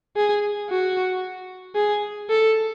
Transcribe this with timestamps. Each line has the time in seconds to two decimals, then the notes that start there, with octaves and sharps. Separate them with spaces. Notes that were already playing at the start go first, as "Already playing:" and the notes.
0.16 G#4
0.70 F#4
1.75 G#4
2.30 A4